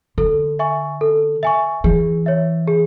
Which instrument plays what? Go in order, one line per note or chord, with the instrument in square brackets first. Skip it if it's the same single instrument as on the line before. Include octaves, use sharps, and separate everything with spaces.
[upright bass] D3 [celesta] A4
[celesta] E5 G#5 C#6
A4
E5 G#5 C#6
[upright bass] E3 [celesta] G#4
[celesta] C#5 E5
G#4